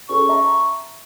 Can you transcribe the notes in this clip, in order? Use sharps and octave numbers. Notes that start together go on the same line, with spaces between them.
C#4 G#4 A4 C#6
E5 A5 A#5